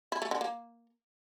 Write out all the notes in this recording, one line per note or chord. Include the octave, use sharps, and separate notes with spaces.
E4
A3
D3
A#3